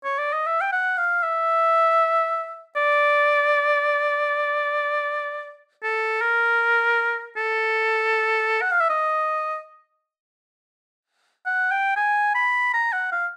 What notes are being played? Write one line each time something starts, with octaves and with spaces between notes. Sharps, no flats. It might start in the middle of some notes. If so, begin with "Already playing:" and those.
C#5
D5
D#5
E5
G5
F#5
F5
E5
D5
A4
A#4
A4
F#5
F5
E5
D#5
F#5
G5
G#5
B5
A#5
F#5
F5